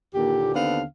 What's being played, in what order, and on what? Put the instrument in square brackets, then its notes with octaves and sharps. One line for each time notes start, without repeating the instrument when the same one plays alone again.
[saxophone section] D#2 A#2 D3 G4
D#2 D3 B3 C4 D4 F5